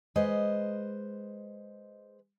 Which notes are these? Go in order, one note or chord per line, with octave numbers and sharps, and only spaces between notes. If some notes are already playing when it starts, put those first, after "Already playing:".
G#3 B4 C5 D#5